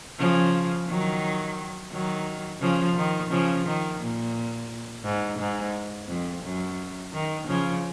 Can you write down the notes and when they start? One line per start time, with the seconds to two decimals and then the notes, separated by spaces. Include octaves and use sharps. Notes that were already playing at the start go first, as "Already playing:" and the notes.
0.18 C#3 F3
0.88 D#3 F#3
1.92 D#3 F#3
2.61 C#3 F3
2.96 D#3
3.31 C#3 F3
3.66 D#3
4.00 A#2
5.04 G#2
5.39 G#2
6.09 F2
6.43 F#2
7.13 D#3
7.47 C#3 F3